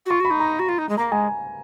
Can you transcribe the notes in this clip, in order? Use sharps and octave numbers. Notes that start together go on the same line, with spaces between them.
F#4
F4 C#6
F#4 B5
D#4
A#5
F#4
F4
D#4
G#3
A#3 A#5
G#3 G#5